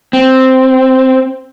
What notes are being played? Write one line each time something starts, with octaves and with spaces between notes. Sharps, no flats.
C4